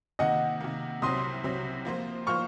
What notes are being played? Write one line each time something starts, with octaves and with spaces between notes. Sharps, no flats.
C3 D#3 A#3 D#5 F#5
C3 D#3 A#3
C2 C3 F#3 C4 C6 D#6
C2 C3 F#3 C4
F3 A#3 F4 C5
F3 A#3 F4 C5 C#6 F6